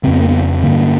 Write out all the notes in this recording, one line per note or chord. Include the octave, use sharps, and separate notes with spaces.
F2 C#3 B3 C4
A#3
B3
G2 D3 A#3